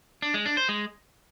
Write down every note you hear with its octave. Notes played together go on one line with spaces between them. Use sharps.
D4
G#3
D4
C5
G#3